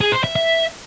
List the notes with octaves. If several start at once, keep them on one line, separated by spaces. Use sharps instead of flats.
G#4
C5
E5
E5